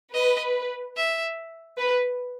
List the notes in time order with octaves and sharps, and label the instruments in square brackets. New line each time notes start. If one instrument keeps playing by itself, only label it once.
[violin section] B4 [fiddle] D#5
[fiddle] E5
[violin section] B4